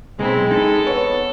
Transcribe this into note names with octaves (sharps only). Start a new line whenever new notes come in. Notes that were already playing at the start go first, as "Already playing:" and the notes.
B1 G#3 C4 E4
D#4 A4
B3 C#5